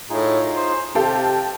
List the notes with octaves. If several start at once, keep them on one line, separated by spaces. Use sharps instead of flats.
A2 D#4 F4 G#4
C5
C3 G4 A4 F5 G5